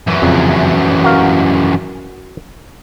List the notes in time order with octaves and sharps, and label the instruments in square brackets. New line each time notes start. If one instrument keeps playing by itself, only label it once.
[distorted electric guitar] F#2 E3
[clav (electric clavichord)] F2 C#3
F#4 A#4 F5